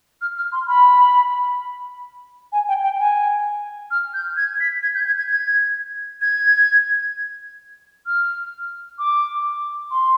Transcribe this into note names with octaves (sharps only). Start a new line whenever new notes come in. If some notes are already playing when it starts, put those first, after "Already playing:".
F6
F6
C6
B5
G#5
G5
G5
G#5
F6
G6
G#6
B6
G#6
G6
G#6
G#6
G#6
G#6
F6
D6
C6